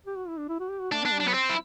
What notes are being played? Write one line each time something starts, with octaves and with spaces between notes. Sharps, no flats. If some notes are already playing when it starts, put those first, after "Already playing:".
G4
F#4
E4
D4
E4
F#4
G4
F#4
A3 D4
B3 D4
G3
D4
F#3 B3
C4
E4